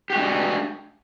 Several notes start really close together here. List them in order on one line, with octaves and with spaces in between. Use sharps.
G4 F#4 G#3 D4